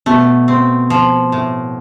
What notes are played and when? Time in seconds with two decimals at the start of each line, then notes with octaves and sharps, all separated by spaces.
0.06 B2 A3
0.48 C4
0.90 F3
1.32 A2